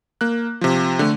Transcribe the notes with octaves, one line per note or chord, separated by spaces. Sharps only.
A#3 F#6
C3 F3
D3 A3